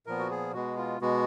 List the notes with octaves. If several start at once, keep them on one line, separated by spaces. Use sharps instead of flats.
A#2 F3 B3 A#4
F#4
G#4
B2 G#3 B3 F#4
F4
B2 G#3 B3 F#4